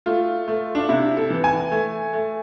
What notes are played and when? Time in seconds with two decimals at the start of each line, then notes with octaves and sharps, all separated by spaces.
0.06 A3 F4
0.48 A3
0.75 D4
0.89 C3 E4
1.17 A4
1.30 E3
1.44 G#5
1.71 A3
2.13 A3